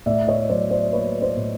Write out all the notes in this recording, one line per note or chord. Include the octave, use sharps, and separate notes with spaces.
A2 D5 E5
C#5 D#5
F#3 C5 D5
C5 D5
A#3 B4 C#5
C5 D5
A2